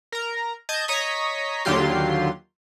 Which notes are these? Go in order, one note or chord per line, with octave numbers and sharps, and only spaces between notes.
A#4 A#5
D#5 A5 G6 G#6
C#5 D#5 A#5 C#6 D#6 B6
D#2 D3 F#3 F4 G4 C6